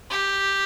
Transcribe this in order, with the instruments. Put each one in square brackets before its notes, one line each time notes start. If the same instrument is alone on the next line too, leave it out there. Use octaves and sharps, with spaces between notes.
[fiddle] G4